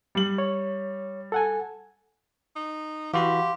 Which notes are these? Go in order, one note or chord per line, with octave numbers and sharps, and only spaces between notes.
G3 F#7
C#5
A4 F#5 G#5
D#4
E3 F#4 G4 F5 B5 C6